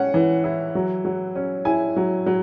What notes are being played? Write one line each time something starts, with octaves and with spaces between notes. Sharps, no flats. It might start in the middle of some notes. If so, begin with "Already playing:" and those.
Already playing: C#4 F#5
E3
E4
F#3
F#3
C#4
E4 G#5
F#3
F#3